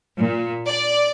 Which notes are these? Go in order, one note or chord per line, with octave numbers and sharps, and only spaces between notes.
A#2
D5